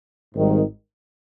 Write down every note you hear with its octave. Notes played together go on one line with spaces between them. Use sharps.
G#1 G#2 D#3 G3